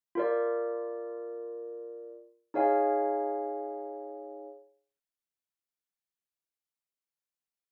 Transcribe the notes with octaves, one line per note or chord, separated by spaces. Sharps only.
F4 A#4 D5
D#4 G#4 C#5 F5 G#5